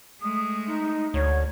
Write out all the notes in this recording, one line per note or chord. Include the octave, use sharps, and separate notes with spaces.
G#3 A3 D#6
D#4
D2 C#5